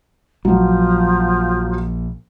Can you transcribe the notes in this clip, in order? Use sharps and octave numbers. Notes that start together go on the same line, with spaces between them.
A#1 F3 F#3